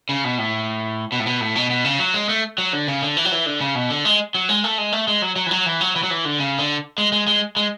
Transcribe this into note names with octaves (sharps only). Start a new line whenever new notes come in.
C#3
B2
A2
B2
A2
B2
A2
B2
B2
C#3
F#3
G#3
A3
F#3
D3
C#3
D3
E3
F#3
E3
D3
C#3
B2
D3
G#3
F#3
G#3
A3
G#3
A3
G#3
F#3
F#3
E3
F#3
E3
F#3
E3
F#3
E3
D3
C#3
D3
G#3
G#3
G#3
G#3